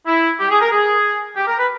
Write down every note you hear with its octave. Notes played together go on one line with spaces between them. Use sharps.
E4
G4
G#4
A#4
G#4
G4
A#4
B4